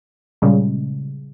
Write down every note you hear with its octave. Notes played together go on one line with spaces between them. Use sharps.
A#2 C#3 G3 G#3